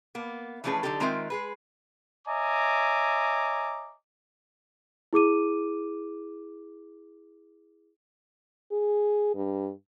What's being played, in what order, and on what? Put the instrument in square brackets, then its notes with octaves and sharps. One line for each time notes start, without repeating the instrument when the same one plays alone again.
[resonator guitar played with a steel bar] A#3 B3
E3 F3 A3 C#4 G#4 B4
D3 F#3 C4 D#4 G4 A4
D#3 G#3 C4 F4 A#4 E5
G#3 G#4 B4
[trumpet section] C#5 D#5 E5 G#5 A#5 D6
[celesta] E4 G#4 D6 D#7
[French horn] G#4
G2